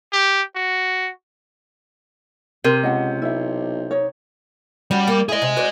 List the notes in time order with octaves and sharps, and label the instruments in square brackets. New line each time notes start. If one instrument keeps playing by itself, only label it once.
[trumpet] G4
F#4
[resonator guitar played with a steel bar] C3 [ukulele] A#4
[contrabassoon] C#2 [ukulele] D#5 F#5
[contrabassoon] B1 [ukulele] E4 E5
[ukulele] D#4 C#5
[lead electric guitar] G3 [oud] C#4 F#4
[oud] A#3
[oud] E4 D5 [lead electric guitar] G#4 D#5
[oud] C3
F#4 C5 D5